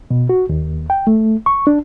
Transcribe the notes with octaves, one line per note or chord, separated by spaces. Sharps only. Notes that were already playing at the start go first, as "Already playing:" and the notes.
B2
F#4
D#2
G5
A3
C#6
D4